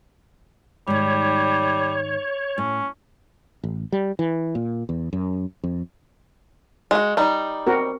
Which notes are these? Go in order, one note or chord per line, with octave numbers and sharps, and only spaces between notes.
G#2 D#3 G3 C#5
A2 C#4
A1
G3
E3
A#2
E2
F#2
F2
G#3 F#4
G3 D#4
C4 F#4 A#4